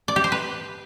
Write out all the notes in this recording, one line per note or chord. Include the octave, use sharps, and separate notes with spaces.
D5
G4
C5
B4